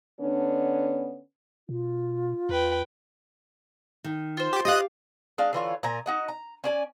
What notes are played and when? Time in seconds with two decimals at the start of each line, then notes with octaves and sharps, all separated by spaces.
0.21 D3 B3 C#4 D4
1.69 B2 F4
2.49 E2 B4 G5
4.04 D#3
4.37 F4 C5
4.53 G4
4.65 G4 D#5 F5 D#6 F#6
5.38 G#3 D4 F5
5.53 D3 E3 F4 C#5
5.83 A#2 G#5 A#5
6.06 D#4 F#4 D#5
6.28 A#5
6.64 C#4 D5 G#5